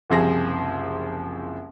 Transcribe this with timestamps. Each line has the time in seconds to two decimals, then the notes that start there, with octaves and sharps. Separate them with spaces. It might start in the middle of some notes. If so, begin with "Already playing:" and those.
0.10 F#1 C2 C3 F3 G#4 A#6